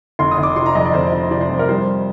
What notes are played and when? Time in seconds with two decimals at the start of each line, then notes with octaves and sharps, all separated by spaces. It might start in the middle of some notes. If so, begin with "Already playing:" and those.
0.19 F1 C6
0.31 D#6
0.38 F1
0.43 D6
0.56 C3 C6
0.66 A#5
0.75 F2 D#5
0.84 D5
0.94 F1 C5
1.12 F1
1.31 C3 D5
1.41 C5
1.50 F2
1.59 A#4
1.69 G3 C5